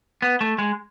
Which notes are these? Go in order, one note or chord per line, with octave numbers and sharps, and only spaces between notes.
B3
A3
G#3